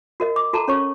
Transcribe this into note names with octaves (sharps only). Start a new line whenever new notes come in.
F#4 A#4 D#5
D6
F#4 A4 A5 A#5
C#4 C#5 C#6